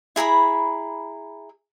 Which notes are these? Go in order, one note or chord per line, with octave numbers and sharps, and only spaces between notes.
E4 G#4 A#5 B5